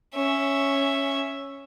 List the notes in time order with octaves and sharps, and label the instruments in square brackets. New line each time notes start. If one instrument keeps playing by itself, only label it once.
[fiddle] C#4 E5